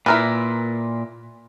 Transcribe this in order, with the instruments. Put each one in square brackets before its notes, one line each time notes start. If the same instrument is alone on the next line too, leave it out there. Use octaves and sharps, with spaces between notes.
[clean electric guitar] A#2 [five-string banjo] E4 A#4 B4